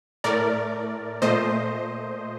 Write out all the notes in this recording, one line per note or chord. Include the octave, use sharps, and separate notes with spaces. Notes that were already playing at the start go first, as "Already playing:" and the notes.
A2 A3 A#4 D5
A#2 A3 C5 D#5